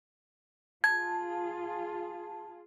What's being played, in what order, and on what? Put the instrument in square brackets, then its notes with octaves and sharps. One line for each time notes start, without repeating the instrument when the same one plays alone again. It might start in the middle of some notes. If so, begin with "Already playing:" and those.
[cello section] F4 G#4 [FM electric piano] A5 [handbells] G#6